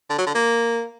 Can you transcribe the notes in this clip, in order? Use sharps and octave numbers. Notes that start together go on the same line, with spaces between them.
D3
F#3
D3
A#3